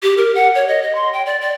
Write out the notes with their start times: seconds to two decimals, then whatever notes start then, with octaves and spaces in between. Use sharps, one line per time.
0.03 G4
0.17 A#4
0.35 F#5
0.55 C#5
0.68 D#5
0.82 D#5
0.95 C6
1.13 G5
1.26 D5
1.41 D5